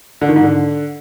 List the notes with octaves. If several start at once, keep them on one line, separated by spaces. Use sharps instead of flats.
D3
D#3
G#2
D3